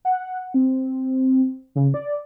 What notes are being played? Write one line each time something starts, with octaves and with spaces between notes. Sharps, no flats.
F#5
C4
C#3
D5